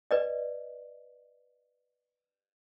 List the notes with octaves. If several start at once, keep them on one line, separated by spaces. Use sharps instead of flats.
B4 D5 D#5